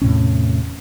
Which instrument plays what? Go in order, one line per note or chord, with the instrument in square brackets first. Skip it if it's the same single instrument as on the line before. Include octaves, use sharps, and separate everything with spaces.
[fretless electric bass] E2 A2 C3 C#4